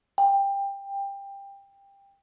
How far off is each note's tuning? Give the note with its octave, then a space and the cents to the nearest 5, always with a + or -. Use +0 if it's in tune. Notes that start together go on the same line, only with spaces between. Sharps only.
G5 +20